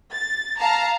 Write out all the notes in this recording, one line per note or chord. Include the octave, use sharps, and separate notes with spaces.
A6
F5 A5 A#5